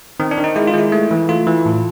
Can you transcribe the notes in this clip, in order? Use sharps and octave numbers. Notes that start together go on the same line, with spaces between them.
D#3 C4
D4
D#3
D#4
G#3 E4
F4
G#3 E4
A3
E3
A3 F4
E3
A2